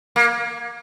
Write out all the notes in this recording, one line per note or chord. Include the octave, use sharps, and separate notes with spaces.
A#3